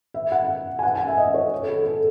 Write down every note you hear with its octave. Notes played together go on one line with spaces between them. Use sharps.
E5
F#5
G#5
F#5
G#5
E5
D#5
C#5
A4
G#4
A4